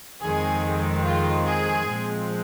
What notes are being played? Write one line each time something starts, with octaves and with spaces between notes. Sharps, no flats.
F2 D#3 G#3 C4 G#4
F4
G#4
A#2 F3 G#3 C4